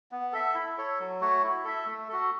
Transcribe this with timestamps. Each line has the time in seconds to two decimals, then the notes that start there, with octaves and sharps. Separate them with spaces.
0.12 B3
0.33 A4 E5
0.54 E4
0.78 A4 C#5
0.99 F#3
1.21 A3 F#4 C#5
1.43 E4
1.64 A4 E5
1.86 A3
2.09 F#4 A4